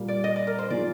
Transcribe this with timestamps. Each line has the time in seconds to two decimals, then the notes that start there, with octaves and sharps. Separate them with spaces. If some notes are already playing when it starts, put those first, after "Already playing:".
Already playing: A#2 G3 A#3
0.08 D5
0.24 D#5
0.36 D5
0.47 A#4
0.59 C5
0.70 D#3 A#3 F4 G#4 D5